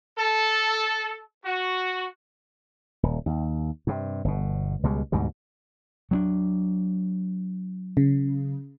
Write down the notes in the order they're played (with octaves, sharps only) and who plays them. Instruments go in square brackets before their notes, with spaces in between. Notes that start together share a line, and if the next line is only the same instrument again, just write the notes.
[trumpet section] A4
F#4
[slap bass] D#1
D#2
G2 C3
G1 B2
C#2 B2 G3 G#3
D2 G#2 B2 G3
F#3 C4 D4
[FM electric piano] C#3